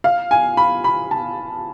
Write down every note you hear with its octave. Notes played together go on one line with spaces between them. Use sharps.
F5
G#5
B5
B5
A5